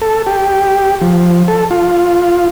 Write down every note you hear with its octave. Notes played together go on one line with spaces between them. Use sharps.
A4
G4
F3
A4
F4